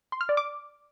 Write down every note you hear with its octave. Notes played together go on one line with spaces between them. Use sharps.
C6
F6
D5
D6